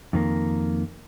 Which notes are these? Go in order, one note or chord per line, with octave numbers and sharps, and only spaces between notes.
F2 D#3 A#3